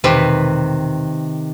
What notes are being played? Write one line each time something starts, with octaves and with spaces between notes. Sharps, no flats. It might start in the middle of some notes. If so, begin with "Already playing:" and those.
E1 C3 D#3 B4